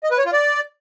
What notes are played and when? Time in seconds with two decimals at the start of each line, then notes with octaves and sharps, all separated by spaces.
0.04 D#5
0.11 B4
0.18 C#5
0.26 F4
0.33 D5